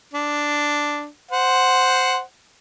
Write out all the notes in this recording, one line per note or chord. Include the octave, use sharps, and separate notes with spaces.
D4
C5 F#5